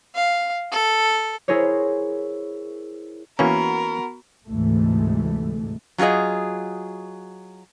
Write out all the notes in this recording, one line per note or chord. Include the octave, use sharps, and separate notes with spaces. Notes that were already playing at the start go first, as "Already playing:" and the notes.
F5
A4
E4 G#4 A#4 C5 C#5
E3 A#3 B3 C#4 F#4 A#4 B5
D2 G#2 C3 E3 G#3 A3
F#3 F4 F#4 G#4 D#5